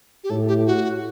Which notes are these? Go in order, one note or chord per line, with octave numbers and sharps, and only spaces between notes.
G4
A2 A4
G4
F#4